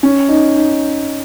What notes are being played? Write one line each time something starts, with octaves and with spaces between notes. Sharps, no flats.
C#4
D#4
D#4